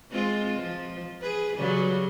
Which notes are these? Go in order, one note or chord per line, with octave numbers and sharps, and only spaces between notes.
G#3 C4 F4
F3
G#4 B4
C#3 F#3 G3